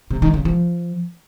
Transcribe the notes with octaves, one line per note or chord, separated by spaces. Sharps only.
C3
D#3
C#3
F3